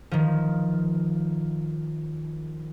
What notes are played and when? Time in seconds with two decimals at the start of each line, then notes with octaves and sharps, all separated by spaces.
0.11 D#3 F3